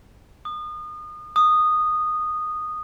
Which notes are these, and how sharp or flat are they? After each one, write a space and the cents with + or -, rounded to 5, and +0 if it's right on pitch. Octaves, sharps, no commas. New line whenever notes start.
D#6 -30
D#6 -10